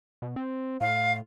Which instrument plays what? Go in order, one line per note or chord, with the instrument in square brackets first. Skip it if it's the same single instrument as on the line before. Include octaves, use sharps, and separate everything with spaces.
[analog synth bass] B2
C4
[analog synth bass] A2 [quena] F5